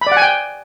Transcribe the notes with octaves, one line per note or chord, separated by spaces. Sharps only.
B5
D5
F#5
G#5
G5